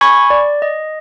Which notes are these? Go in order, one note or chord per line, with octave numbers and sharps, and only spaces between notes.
G#5 B5 C#6 G#6
D5
D#5